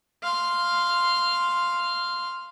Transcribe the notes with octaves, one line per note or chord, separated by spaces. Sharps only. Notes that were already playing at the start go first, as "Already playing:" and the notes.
F5 C6